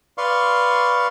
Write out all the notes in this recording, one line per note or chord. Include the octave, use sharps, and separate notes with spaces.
B4 D5 F5 C6 C#6